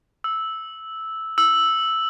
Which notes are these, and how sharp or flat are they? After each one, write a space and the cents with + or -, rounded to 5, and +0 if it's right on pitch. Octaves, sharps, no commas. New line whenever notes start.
E6 -10
E6 -5